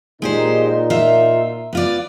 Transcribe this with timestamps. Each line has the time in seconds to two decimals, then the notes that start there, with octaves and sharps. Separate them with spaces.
0.22 A#2 G#3 D#4 G4 C5
0.90 F4 E5
1.73 B3 F4 D5